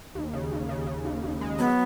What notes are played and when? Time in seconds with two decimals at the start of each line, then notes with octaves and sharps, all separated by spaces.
0.15 D#2
0.33 C#3
0.51 D#2
0.69 C#3
0.87 C#3
1.05 D#2
1.23 D#2
1.41 G#3
1.58 F#3 B3